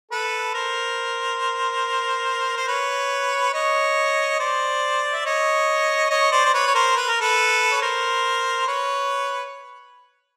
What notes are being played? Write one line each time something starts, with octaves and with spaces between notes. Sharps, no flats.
A4 B4
A#4 C5
C5
B4 C#5
C#5 D#5
C5 D5
E5
C#5 D#5
C#5 D#5
C5 D5
C5
B4 C#5
C#5
A#4 C5
B4
A#4
A4 B4
C#5
A#4 C5
B4 C#5